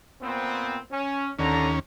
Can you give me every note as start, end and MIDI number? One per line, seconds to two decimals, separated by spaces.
0.22 0.77 46
0.22 0.77 59
0.22 0.77 60
0.92 1.30 61
1.39 1.79 39
1.39 1.69 50
1.39 1.79 61
1.39 1.69 82